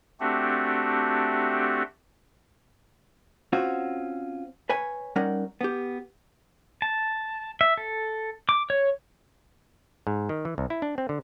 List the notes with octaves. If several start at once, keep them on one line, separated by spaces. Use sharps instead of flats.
A3 C4 D4 F#4 G4
C4 C#4 F4 F#4
B4 C#5 G#5
G3 C#4 D#4 A#4 F#5
B3 G4
A5
E5
A4
D6
C#5
G#2
D#3
E3
C2
E4
D4
C4
D3